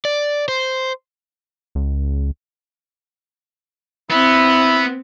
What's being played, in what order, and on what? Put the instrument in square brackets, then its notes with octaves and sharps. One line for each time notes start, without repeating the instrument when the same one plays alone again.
[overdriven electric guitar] D5
C5
[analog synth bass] C#2
[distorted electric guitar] B3 [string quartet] C4 [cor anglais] E4